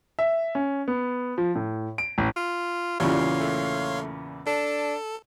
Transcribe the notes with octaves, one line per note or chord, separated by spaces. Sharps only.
E5
C#4
B3
F3
A2
D7
A1
F4
E2 A#2 C#3 G3 C#5 F5 C6
A3
D4 A4